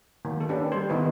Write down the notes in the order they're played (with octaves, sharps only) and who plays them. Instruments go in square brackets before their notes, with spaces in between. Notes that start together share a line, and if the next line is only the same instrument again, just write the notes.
[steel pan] D#3 F#3 A#3
A#3 A4
A#3 C#4 D4 G4 A4 B4
G3 G4 C5
D#3 B3 D#4 E4 B4